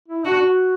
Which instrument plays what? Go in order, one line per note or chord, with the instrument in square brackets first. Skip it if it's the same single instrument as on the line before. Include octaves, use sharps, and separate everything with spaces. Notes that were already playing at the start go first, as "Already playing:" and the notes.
[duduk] E4
[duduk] D4 [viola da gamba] F#4
[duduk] F#4